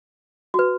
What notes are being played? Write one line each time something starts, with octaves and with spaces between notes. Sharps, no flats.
F#4 B4